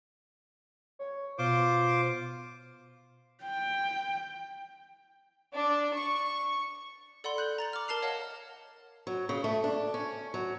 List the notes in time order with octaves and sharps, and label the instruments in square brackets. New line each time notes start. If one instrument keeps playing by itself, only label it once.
[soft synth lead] C#5
[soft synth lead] B2 [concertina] F4 C5 D6
[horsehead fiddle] G5
[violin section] D4
C#6
[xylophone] A4 D5 F#5 B5 C6
F#6 G6 F#7
A#5 A6 F#7
D6 F6
A#4 A5 F6 C7 F7
C#5 D#5 F5 F#5 A5
[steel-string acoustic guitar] F#3
C#3
A3
D4
C#4
F#3